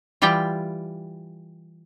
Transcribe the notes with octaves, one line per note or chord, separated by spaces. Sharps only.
E3 G3 F4 G4 G5